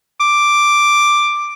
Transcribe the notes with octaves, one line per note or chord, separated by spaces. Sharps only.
D6